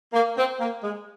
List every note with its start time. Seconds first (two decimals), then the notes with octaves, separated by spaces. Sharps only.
0.13 A#3
0.37 C4
0.60 A#3
0.83 G#3